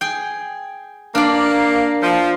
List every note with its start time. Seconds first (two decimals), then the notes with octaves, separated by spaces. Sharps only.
0.01 G#4 G5
1.15 A#3 D4 D5
2.02 F3